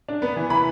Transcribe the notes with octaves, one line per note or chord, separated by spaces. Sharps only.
D4
B3
E3
E3 B5